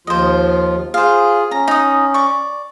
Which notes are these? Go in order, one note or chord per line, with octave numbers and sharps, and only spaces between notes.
D#2 F3 F4 C5 D#5
F4 G#4 C5 F5
C#4 A#5
D#4 D#6
D5 C#6